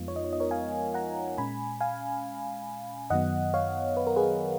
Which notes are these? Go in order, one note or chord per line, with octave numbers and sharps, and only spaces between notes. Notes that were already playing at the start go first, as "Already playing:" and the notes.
Already playing: F2 F3 G#3 B3 D#4 F4
C#5
D#5
C#5
D#5
A#4 C#5
F5 G#5
F#5 A#5
A#2 G#3 C#4 G#5 B5
F5 G#5
F#2 D#3 F#3 B3 D#5 F#5
C#5 F5
B4
A#4
G#4 B4